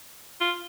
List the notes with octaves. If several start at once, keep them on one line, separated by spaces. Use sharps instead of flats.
F4